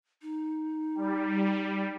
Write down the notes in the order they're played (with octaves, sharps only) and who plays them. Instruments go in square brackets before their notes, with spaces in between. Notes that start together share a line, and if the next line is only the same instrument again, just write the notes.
[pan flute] D#4
[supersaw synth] G3